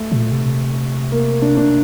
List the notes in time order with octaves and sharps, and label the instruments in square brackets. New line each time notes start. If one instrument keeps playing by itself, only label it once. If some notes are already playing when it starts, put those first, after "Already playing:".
Already playing: [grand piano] A3
[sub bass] A#2
C3
[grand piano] A#3
D4
D4